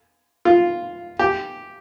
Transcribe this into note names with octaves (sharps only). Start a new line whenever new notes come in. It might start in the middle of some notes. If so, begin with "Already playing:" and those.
F4
G4